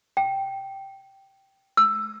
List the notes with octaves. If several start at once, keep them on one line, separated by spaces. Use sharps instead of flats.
G5
E6